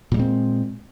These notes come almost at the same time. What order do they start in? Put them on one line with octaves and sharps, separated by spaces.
A#2 G3 G#3 C4